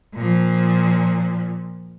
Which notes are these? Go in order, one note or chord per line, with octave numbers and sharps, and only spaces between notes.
A#2 F3